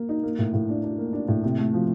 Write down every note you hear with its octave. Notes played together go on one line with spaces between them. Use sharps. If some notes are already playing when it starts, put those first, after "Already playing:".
Already playing: A#3
D#4
A#3
A2
A2
D4
D4
A#3
D4
A2
C3
A3
F3